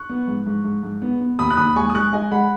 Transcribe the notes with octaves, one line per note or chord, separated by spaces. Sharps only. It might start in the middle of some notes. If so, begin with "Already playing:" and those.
Already playing: C#6 F#6
B3
G#2
G#2
G#2
G#2
B3
B3
D#2 B5 D#6
F#6
D#2 B5 D#6
G#3 G#5 C#6
D#6
G#3 C#6 F#6
G#3 D#5 G#5
G#3 F#5 B5